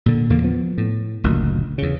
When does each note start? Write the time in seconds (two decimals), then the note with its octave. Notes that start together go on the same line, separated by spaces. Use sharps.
0.06 A#2 D3
0.30 E2 D3 A#3
0.44 F3 B3
0.78 A2
1.24 F#1 D2 A#2 D#3
1.78 E2 C#3